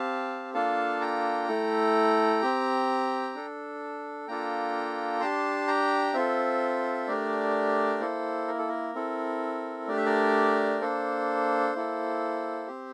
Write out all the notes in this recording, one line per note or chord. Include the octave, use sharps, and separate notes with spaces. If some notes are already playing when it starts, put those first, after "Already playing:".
Already playing: C4 G4 F5 A5
A#3 D4 F4 A4 F5 A5
G5 A#5
A3 E4 A4
C4 G4
D4 A4
A#3 D4 F4 A4 G5 A#5
D4 G4 A5 C6
G5 A#5
C4 F4 A4 C5 E5
A3 D4 G4 A#4 D5
A#3 E4 A4 C5
A#4
A4
A#4
C4 E4 A4
A3 D4 G4 D5
E5
A#4 D5
A#3 D4 A4 C5
A#3 E4 A4
C4 G4